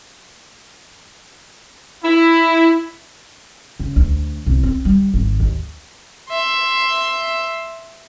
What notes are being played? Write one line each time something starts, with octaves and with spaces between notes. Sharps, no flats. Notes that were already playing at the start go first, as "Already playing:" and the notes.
E4
C#3
D2
C2
C4
G3
G#1
D#2
E5 C6